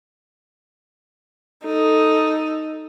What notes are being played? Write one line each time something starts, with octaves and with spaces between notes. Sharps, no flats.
D#4 A4